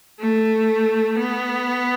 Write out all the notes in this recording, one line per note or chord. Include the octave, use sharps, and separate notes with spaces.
A3
B3